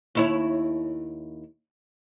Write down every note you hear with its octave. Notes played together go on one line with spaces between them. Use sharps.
D#2 E4 C#5